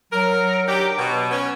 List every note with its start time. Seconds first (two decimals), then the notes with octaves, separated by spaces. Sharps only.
0.13 F#3 A#4
0.68 D#3 D4 G4
0.98 B2
1.31 B3 C#4